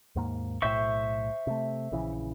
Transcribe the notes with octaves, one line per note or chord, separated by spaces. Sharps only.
D#2 G#2 A#3
B1 A2 C5 E5 C#6
C3 A3
A#1 C#3 E3